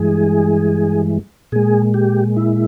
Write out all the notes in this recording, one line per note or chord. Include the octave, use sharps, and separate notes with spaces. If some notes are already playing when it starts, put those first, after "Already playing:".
Already playing: G2 E3 G#3 G#4
A#2 G#3 G#4
G4
E4